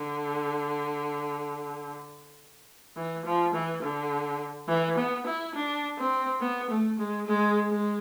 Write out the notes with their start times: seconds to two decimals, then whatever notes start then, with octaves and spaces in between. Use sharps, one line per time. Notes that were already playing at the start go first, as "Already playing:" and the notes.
Already playing: D3
2.97 E3
3.25 F3
3.54 E3
3.82 D3
4.68 E3
4.97 B3
5.26 E4
5.55 D4
5.98 C4
6.41 B3
6.70 A3
6.99 G#3
7.27 G#3
7.70 G#3